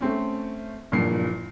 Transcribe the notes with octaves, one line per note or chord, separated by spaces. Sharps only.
A3 C4 C#4
F#1 G2 A#2 F3 A#4 C7